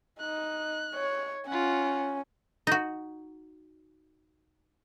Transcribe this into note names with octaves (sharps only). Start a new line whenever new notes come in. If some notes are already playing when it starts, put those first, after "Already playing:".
D#4 F#6
C#5
C#4 F4 F#5
D#4 F#4